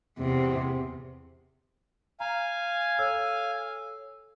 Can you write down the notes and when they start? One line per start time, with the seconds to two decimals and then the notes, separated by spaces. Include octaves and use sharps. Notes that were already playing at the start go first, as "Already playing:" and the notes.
0.19 E2 C3
2.20 F5 G#5 A#5
2.99 A4 C#5 E6